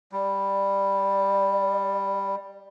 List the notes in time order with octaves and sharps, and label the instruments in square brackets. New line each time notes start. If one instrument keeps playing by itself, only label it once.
[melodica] G3 [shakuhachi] D5